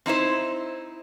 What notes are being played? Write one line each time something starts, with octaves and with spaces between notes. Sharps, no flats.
C4 D#4 E4 C5